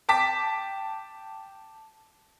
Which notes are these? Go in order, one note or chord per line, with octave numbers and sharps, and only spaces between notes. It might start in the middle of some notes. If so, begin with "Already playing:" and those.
G5 A5 D6 B6